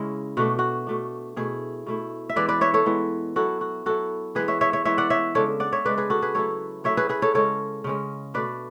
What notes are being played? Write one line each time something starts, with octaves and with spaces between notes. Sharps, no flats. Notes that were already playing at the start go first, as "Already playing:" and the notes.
Already playing: C#3 G#3 C#4 E4
B2 A3 D4 F#4
F#4
B2 A3 D4
B2 A3 E4 G#4
B2 A3 E4
E5
E3 G#3 B3 B4 D5
B4 D5
C#5 E5
A4 C#5
E3 G#3 B3
F#3 B3 E4 F#4 A4
F#4
F#3 B3 E4 F#4 A4
E3 G#3 B3 G#4 B4
C#5 E5
C#5 E5
C#5 E5
E3 G#3 B3 C#5 E5
D5 F#5
C#5 E5
C#3 G#3 D4 A4 C#5
D5 F#5
C#5 E5
C#3 G#3 D4 B4 D5
G#4 B4
F#4 A4
G#4 B4
F#3 A3 E4 A4 C#5
F#3 A3 E4 C#5 E5
G#4 B4
G#4 B4
A4 C#5
C#3 G#3 C#4 A4 C#5
C#3 G#3 C#4
B2 A3 D4 B4 D5